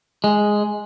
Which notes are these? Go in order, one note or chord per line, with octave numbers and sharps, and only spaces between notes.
G#3